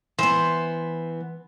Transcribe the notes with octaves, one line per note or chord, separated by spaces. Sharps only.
E3 B3 C5